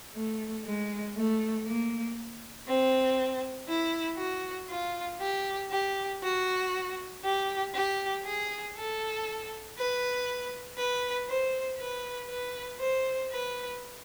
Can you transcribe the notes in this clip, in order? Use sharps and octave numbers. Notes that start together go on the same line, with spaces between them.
A3
G#3
A3
A#3
C4
E4
F#4
F4
G4
G4
F#4
G4
G4
G#4
A4
B4
B4
C5
B4
B4
C5
B4